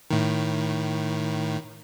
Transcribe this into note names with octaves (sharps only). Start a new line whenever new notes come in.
A2 D#3